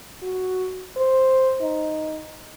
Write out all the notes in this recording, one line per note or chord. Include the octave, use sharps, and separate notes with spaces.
F#4
C5
D#4